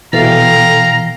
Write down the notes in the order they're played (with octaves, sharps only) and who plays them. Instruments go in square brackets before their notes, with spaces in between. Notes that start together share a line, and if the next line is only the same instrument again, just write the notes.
[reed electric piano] B2 E3 [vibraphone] A4 [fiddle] F5 G5 [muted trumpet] A#5